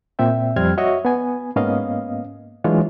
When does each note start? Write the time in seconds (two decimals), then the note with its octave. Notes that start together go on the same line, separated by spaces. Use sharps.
0.19 A#2 C4 E5 G5
0.56 F2 G3 C4 F6 G#6
0.78 F#4 C#5 D#5 E5 C#6
1.05 B3 G#5
1.56 G#2 A#3 B3 C#4 D#5 F5
2.64 E3 F#3 G#3 D4 F4 C#5